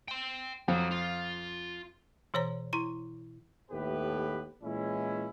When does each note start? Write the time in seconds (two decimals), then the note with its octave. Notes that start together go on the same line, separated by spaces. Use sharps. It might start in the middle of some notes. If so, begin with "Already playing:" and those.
0.08 G5 C6
0.68 F2 F#3
0.91 F4
2.34 B2 E3 C5 C#5 A#5
2.73 E4 A#5 C6
3.71 D#2 A2 A3 B3 G4 B4
4.62 A#2 E3 G#3 C#4 E4